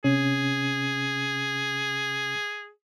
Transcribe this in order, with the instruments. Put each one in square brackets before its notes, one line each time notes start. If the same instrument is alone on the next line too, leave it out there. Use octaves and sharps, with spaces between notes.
[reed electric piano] C3 C#4 [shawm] G#4